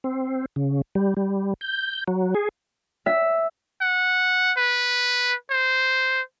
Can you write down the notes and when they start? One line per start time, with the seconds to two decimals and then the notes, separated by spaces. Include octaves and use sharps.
0.04 C4
0.56 C#3
0.95 G3
1.17 G3
1.61 G6
2.08 F#3
2.35 G#4
3.06 E5
3.81 F#5
4.57 B4
5.50 C5